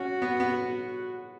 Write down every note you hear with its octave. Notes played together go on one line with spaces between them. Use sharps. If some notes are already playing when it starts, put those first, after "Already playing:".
Already playing: C#4 F#4
B3
B3